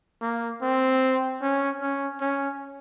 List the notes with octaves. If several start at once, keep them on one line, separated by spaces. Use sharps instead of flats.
A#3
C4
C#4
C#4
C#4